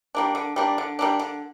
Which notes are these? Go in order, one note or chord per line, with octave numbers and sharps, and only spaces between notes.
G3 A#3 D4
D3
G3 A#3 D4
D3
G3 A#3 D4
D3